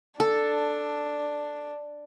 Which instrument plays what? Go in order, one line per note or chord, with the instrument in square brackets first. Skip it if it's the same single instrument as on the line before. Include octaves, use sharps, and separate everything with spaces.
[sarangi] D4 [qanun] A4